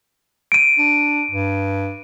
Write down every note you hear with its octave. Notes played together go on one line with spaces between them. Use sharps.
D7 D#7
D4
G2